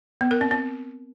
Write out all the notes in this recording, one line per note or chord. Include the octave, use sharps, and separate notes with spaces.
B3
A#4
C4
C4